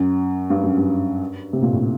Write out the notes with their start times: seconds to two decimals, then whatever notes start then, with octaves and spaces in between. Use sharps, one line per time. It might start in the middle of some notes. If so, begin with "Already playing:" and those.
Already playing: F#2
0.50 G2
0.64 F#2
0.78 G2
1.53 C3
1.62 A#2
1.72 A2